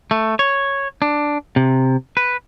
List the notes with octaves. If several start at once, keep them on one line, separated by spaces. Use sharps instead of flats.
A3
C#5
D4
C3
B4